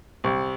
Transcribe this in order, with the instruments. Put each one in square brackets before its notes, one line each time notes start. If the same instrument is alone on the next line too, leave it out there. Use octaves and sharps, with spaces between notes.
[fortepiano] C2